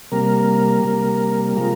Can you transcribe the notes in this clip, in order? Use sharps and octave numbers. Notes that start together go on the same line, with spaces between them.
C3 G3 A#3 A#4
C3 G3 A#3
C3 F3 G#3 A#4